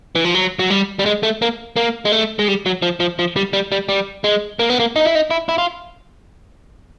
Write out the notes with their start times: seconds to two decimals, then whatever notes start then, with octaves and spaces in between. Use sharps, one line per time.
0.15 E3
0.25 F3
0.35 F#3
0.59 F#3
0.70 G3
0.99 G3
1.06 G#3
1.23 A3
1.42 A#3
1.76 A#3
2.05 G#3
2.12 A3
2.39 G#3
2.48 G3
2.66 F#3
2.82 F3
3.00 F3
3.19 F3
3.36 G3
3.53 G3
3.72 G3
3.89 G3
4.24 G#3
4.59 A#3
4.70 B3
4.79 A#3
4.96 D#4
5.06 E4
5.15 D#4
5.31 E4
5.49 E4
5.58 F4